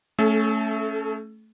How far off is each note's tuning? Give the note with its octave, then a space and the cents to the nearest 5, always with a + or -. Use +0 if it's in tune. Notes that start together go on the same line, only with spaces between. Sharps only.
A3 +0 C#4 +0 A4 -35